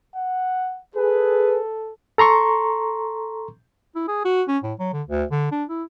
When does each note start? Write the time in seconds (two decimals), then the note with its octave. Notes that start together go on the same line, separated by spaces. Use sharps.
0.15 F#5
0.96 G#4 A4 B4
2.18 A4 A#5 C6 C#6
3.95 E4
4.08 G#4
4.25 F#4
4.48 C#4
4.63 A2
4.79 F#3
4.93 D3
5.08 D2
5.31 D3
5.52 D4
5.69 E4